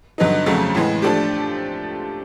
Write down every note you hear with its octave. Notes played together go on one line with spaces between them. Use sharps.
G2 D3 F#3 B3 D#4
F2 C#3 F#3 A3
A2 E3 G#3 B3
F3 A3 D4 G4